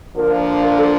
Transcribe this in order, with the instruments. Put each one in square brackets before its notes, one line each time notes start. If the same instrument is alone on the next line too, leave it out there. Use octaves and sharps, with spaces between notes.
[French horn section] D3 F3 A#3 D4 F4 [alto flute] A#4
[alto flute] A#4
A4